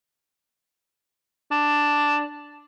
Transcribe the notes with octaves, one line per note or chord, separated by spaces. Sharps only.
D4